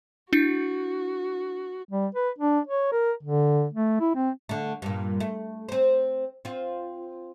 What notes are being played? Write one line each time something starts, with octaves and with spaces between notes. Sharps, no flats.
D4 E4 F#4 C#7
G3
B4
D4
C#5
A#4
D3
A3
E4
C4
D3 A3
G2 A#2
A3
C4 C5
C4 F4